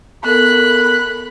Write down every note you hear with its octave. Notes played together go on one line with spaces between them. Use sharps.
B3 A4 A#4 B5 F#6